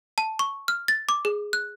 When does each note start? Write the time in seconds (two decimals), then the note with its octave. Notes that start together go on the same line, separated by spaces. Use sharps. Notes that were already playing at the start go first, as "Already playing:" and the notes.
0.18 A5
0.39 C#6
0.68 F6
0.88 A6
1.09 D6
1.25 G#4
1.53 F#6